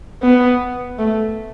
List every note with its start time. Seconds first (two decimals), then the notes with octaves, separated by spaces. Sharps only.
0.23 B3
0.99 A3